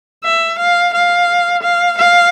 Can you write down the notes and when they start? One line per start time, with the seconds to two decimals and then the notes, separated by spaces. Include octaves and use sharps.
0.25 E5
0.59 F5
0.94 F5
1.63 F5
1.98 F5